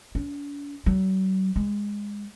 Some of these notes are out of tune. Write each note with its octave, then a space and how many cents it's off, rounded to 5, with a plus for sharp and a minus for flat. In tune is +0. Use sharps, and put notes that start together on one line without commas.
D4 -45
F#3 +40
G#3 -15